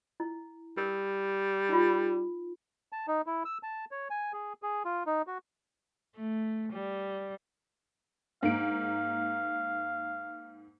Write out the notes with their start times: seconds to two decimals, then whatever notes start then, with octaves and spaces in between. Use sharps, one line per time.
0.20 E4
0.77 G3 A#4
1.69 D#4 F4
2.92 A5
3.08 D#4
3.26 E4
3.45 E6
3.63 A5
3.91 C#5
4.10 G#5
4.33 G#4
4.62 G#4
4.85 F4
5.07 D#4
5.27 F#4
6.16 A3
6.72 G3
8.43 G#2 A#3 F5 D7